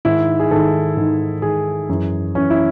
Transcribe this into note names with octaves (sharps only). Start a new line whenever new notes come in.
G#2 D#3 E4
G#4
G#2 D#3 A4
G#2 D#3
G#2 D#3 G#4
F#2 E3
F#2 E3 C#4
E4